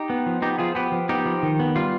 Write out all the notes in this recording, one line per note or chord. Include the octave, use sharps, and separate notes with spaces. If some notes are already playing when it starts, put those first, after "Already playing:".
Already playing: D#4 G4
B3
F3
B3 D#4 G4
F3 F4 G#4
B3 G4 B4
F3
B3 D#4 G4
F3
D#3
B3
G3 F4